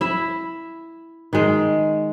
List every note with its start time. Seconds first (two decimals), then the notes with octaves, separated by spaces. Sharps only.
0.01 E4 E5
1.33 D#3 G#3